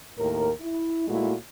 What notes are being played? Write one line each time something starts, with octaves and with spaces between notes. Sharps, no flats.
D#2 A2 A#4
E4
A#2 G#3 A3 E4 F#4